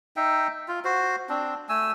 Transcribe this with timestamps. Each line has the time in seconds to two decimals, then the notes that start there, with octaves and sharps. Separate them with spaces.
0.16 D#4 E5 G5
0.68 F4
0.84 F#4 C5
1.29 C4 D4
1.69 A3 G#5 E6